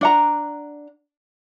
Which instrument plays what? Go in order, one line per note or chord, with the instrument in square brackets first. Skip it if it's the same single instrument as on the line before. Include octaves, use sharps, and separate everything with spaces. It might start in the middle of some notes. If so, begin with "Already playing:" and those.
[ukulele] D4 F#5 A#5